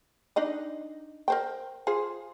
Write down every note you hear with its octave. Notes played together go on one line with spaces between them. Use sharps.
D4 D#4 D#5
A#4 C5 G5
F4 G#4 C5